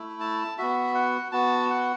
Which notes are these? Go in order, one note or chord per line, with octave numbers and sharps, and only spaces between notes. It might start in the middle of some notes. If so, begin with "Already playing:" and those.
Already playing: A3 E4
A5
B3 F#4 E5
F#5
B3 F#4 A5
F#5